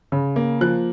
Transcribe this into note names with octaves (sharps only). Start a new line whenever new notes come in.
C#3
A#3
F3 F#6